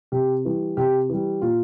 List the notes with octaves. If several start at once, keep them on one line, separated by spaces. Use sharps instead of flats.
C3 G4
E3 G3
C3 G4
E3 G3
A#2 F4